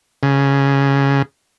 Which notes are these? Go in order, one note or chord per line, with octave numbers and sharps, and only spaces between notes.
C#3